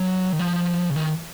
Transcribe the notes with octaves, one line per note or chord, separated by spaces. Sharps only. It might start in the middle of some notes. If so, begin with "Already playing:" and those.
Already playing: F#3
D#3
F3
C#3
D#3